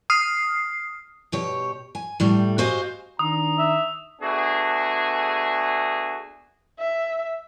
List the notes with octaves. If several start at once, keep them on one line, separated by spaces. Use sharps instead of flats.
D#6 F6 C7
B2 G4 C#5
G#5
A2 G3 A3
F#4 G4 C5 D#5 F5 G#5
D#3 D4 A#5 D#6
E5
A3 B3 D4 F#4 G#4
E5